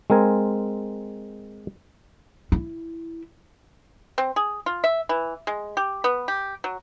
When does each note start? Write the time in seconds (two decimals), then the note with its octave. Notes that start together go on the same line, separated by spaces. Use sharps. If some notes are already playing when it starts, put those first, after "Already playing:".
0.10 G#3 C4 A#4 G#5
2.52 E4
4.18 C4
4.36 G#4
4.66 F4
4.84 E5
5.09 E3
5.47 G#3
5.77 G4
6.04 B3
6.28 G4
6.64 F#3